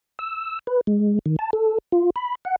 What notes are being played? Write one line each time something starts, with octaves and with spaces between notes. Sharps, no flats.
E6
B4
G#3
D#3
A5
A4
F4
B5
F#5